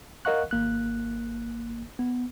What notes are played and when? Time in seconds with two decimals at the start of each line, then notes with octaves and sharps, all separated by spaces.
0.25 A#4 D#5 F5 F#5 C#6 F#6
0.51 G#1 A#3 F#6
1.99 B3